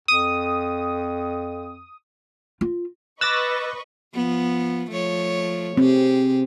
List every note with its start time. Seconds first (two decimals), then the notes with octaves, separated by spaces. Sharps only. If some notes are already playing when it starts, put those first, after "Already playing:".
0.08 F2 D#6
2.61 F4
3.21 B4 D#5 C#6 D6 E6 F#6 A6 A#6
4.14 F3 B3
4.91 F3 A3 C#5
5.77 C3 C4 G4 G#4